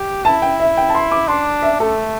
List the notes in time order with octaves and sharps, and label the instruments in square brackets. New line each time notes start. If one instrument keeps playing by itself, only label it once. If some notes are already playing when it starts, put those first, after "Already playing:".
Already playing: [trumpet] G4
[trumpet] E4 [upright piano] A5
[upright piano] G5
E5
G5
A5
C6
D6
[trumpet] D4 [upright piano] C6
[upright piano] E5
[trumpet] A3 [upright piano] A4